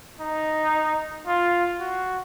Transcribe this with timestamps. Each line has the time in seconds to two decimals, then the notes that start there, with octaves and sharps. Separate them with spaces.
0.20 D#4
1.27 F4
1.80 F#4